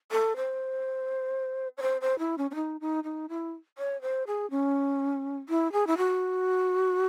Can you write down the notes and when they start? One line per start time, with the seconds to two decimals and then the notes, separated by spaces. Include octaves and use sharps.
0.11 A4
0.36 C5
1.77 C#5
1.82 C5
2.01 C5
2.19 E4
2.38 C#4
2.51 C#4
2.55 D#4
2.81 D#4
3.04 D#4
3.29 E4
3.78 C#5
4.02 C5
4.27 G#4
4.51 C#4
5.49 E4
5.72 G#4
5.87 E4
5.98 F#4